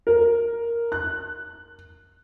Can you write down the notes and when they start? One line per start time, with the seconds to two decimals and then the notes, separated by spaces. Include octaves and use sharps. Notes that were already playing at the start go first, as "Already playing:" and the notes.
0.07 A#4
0.92 F#6